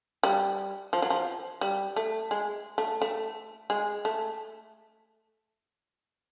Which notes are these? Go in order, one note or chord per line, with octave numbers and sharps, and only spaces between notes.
G3
F3
F#3
F3
G3
A3
G#3
A3
A3
G#3
A3